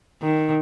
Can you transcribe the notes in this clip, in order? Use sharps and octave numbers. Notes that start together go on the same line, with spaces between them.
D#3